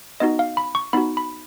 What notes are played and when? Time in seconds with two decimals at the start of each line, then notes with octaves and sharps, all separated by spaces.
0.20 B3 D#4 F#4 D#5
0.39 F5
0.57 B5
0.75 C#6
0.93 B3 D#4 F#4 B5
1.17 B5